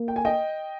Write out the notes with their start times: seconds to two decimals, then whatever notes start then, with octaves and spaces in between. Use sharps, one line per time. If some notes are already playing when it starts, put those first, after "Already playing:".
Already playing: A#3
0.08 G5
0.16 G#5
0.25 D#5 G5